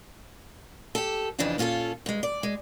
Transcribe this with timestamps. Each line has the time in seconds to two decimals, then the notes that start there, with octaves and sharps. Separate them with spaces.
0.95 G4 A4
1.38 F2 C#3 E3 D4 D#4 F4
1.58 A#2 C#4 F4 G4 A4
2.06 G2 G#3
2.23 D5
2.43 G#3